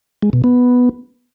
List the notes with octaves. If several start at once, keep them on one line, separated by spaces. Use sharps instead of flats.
G#3
B2
B3